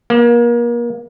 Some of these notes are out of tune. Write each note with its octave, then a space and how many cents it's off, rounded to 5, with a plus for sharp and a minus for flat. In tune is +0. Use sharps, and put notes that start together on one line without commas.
A#3 +35